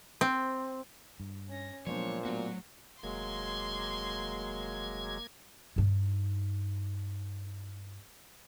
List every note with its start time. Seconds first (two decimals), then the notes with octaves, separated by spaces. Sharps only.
0.21 C4
1.20 G2
1.49 C#4 A#6
1.87 A#2 F3 F#3 G#3 B3 D4 C5 C#5
2.25 A2 F#3 B3 F#4
3.03 F1 F#3 G#3 A#3 C6 G#6
5.76 G2 D#4